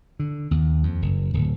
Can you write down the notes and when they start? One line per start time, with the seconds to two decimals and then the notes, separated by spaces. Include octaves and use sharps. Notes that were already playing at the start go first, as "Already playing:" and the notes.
0.20 D3
0.51 D#2
0.83 F2
1.02 F#1
1.34 D1